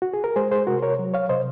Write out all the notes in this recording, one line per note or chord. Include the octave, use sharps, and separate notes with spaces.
F#4
G#4
A#4
G#3 G#4 C5
G#4 C5
C3 F#4 A#4
A#4 C#5
F#3
C#5 F5
C3 C5 D#5